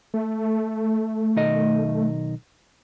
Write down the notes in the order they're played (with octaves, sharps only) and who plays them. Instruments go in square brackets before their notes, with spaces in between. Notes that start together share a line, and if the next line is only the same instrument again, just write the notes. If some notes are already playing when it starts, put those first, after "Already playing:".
[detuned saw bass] A3
[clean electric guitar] B1 D#3 D#5